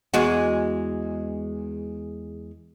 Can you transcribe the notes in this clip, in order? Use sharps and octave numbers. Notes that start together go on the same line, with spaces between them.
E2 G#3 F#4